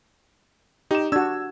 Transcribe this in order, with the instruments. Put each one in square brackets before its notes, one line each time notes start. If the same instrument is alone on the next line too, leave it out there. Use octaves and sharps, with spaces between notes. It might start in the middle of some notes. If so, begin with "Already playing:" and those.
[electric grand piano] D#4 E7 [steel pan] G4
[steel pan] D4 F#4 [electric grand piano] E6 G#6